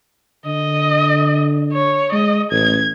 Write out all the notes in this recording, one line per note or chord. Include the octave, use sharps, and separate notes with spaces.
D3 D#5
C#5
G#3 D#5
A1 G#6